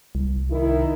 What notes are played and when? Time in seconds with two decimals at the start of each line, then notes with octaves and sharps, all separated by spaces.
0.15 C2
0.50 D#3 E4